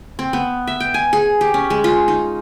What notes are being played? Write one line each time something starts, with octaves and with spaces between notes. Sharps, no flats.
C4
B3
E5
G5
G#5
G#4
G4
C#4
G#3
F4
D#4